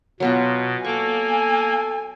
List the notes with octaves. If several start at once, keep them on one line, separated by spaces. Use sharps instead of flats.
B2 F#3 B3 F4
A#3 A4 G#5 C#6 D6